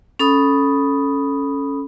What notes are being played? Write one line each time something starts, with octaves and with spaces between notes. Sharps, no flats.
C#4 A4 B5 D#6